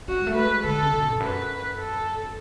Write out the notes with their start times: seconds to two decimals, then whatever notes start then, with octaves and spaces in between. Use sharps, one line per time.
0.08 C#4 F#4
0.20 G#3
0.27 A3
0.36 B4
0.45 G#3
0.64 D3 A4
0.83 C#3
0.93 C#3
1.01 B2
1.15 E2
1.20 F#2 B4
1.76 A4